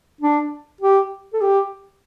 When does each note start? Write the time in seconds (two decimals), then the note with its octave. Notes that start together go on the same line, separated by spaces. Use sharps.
0.21 D4
0.81 G4
1.33 A4
1.41 G4